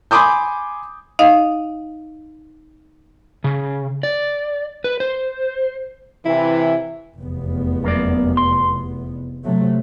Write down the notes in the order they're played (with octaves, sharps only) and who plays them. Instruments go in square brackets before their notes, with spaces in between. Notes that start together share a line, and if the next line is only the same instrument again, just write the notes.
[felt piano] G#5 B5 C6 D6 D#6 G6
[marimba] D#4 D#5 F5
[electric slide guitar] C#3
D5
B4
C5
[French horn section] C3 E3 [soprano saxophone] E4
[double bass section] F1 E2 B3
[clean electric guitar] F#2 A#3 D5
C6
[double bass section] C3 F#3 A3